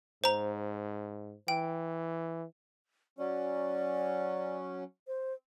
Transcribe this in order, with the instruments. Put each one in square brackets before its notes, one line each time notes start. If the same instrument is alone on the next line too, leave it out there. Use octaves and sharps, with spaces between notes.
[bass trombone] G#2 [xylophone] C5 A#5
[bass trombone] E3 [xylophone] G5
[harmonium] F#3 C#4 [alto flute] D5
[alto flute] C5